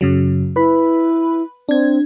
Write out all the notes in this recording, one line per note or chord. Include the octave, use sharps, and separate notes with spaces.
F#2 C#3 F#3
E4 B4 B5
C4 D4 G#6